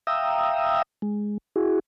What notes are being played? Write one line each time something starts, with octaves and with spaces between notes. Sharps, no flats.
E5 F5 G5 A#5 D#6 E6
G#3
E4 F#4 G#4